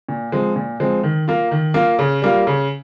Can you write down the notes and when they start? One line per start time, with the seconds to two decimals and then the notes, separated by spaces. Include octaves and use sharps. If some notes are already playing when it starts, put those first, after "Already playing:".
0.09 A#2
0.32 F3 G#3 C4
0.56 A#2
0.80 F3 G#3 C4
1.03 D#3
1.28 A#3 F4
1.51 D#3
1.74 A#3 F4
1.99 C#3
2.22 G3 A#3 F4
2.47 C#3